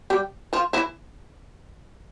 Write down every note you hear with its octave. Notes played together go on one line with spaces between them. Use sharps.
G3 G4
F3 F4
E3 E4